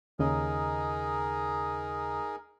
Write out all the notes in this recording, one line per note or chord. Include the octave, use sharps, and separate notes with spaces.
D#2 C#3 D#4 G#4 A#4 D#5